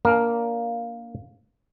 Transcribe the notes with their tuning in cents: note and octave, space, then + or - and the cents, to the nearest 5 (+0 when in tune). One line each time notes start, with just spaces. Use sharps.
A#3 +0 D4 -25 A#4 +5